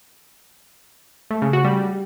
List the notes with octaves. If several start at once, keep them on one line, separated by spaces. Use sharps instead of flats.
A3
C#3
F#4
G3